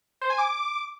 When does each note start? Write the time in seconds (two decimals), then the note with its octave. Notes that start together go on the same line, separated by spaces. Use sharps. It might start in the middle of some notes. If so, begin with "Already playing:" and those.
0.21 C5
0.30 G#5
0.38 D6